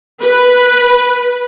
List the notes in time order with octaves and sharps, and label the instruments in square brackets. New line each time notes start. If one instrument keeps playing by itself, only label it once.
[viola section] B4